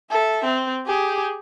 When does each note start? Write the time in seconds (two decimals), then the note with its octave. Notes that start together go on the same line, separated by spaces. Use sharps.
0.11 A4 E5
0.45 C4
0.87 G4 G#4